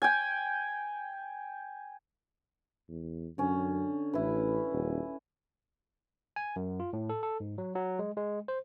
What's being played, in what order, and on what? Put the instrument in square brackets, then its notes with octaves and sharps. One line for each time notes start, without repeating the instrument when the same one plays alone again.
[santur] G5 G#5
[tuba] E2
[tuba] F#2 [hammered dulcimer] D3 C#4
[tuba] A1 [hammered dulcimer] E4 B4
[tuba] D#1
[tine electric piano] G#5
F#2
F4
A2
A4
A4
G#2
F#3
F#3
G#3
G#3
C5